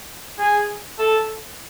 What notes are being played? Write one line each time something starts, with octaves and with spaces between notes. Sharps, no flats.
G#4
A4